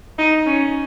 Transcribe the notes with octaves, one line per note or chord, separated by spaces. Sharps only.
D#4
C#4